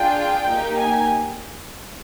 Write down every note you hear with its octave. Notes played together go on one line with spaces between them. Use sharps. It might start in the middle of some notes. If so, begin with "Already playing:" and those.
Already playing: D4 F4 G#4 G5
A#3 D#4 G4
G#5